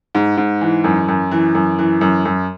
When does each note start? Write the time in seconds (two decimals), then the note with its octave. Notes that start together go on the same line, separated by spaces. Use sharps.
0.15 G#2
0.37 G#2
0.61 E3
0.84 F#2
1.08 F#2
1.31 E3
1.55 F#2
1.79 E3
2.01 F#2
2.25 F#2